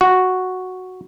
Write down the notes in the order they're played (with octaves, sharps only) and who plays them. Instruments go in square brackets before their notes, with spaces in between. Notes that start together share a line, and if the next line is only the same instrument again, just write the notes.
[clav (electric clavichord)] F#4